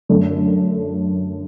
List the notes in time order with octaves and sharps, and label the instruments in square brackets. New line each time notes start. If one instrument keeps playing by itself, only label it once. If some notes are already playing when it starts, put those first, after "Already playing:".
[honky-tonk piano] F#2 D3 A3